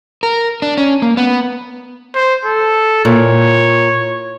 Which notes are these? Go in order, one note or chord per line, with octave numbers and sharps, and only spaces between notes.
A#4
D4
C#4
A#3
B3
C5
A4
A#2 C#5